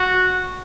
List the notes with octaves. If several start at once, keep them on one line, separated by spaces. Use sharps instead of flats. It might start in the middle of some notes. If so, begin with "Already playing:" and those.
Already playing: F#4